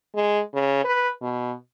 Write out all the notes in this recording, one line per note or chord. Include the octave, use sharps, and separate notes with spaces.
G#3
C#3
B4
B2